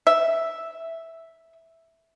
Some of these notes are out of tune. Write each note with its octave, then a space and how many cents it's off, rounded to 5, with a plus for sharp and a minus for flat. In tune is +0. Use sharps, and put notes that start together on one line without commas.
E5 -5